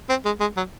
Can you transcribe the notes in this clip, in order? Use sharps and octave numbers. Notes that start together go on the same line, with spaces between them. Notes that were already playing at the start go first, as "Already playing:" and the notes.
C4
G#3
G#3
F#3